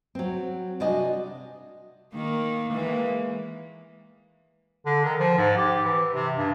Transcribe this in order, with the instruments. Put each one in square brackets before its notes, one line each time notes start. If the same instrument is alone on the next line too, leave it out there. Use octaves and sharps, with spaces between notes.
[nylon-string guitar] F#3 C4
C3 D4 F#4 D#5 G#5
[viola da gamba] D#3 A#3
E3 G#3 A#3
[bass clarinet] D3
D#3
F3
G#2
G4
E3
C3
G2